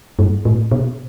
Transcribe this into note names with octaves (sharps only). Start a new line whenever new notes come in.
G2
A2
B2